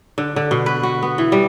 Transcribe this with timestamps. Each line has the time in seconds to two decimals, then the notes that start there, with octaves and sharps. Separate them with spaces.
0.18 D3
0.36 D3
0.51 B2
0.66 B4
0.83 F#4
1.03 B3
1.18 E3
1.32 G3